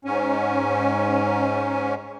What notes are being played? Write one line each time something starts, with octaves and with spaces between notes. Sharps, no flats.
G#2 C#4